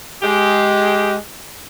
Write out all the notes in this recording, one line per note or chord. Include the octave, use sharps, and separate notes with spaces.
G#3 G4